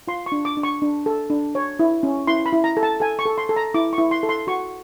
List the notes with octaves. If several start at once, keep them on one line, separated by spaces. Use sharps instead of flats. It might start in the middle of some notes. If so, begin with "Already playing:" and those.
F4 C6
C#6
D4
D6
D4
C#6
D4
A4
D4
C#5
E4
C#4
E4 C6
B5
E4
A#5
A4
A5
A4 G#5
C#6
A4
C6
A4
A#5
E4 D6
C#6
E4
C6
A4
C6
F#4 C#6